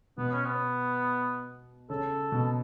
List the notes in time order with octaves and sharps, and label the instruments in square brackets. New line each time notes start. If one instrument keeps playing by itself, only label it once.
[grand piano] B2 [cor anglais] B3
[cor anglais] C#4
B3
[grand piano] C#3 [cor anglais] A4
[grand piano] B2